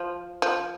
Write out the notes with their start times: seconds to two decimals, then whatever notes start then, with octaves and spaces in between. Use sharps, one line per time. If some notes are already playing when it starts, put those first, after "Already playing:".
Already playing: F3
0.42 F3